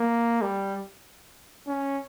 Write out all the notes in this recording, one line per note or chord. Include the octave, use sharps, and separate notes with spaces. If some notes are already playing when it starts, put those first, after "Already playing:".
Already playing: A#3
G3
C#4